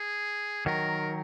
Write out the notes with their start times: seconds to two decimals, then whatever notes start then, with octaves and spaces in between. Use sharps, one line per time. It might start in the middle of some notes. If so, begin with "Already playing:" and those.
Already playing: G#4
0.66 D#3 F#3 A#4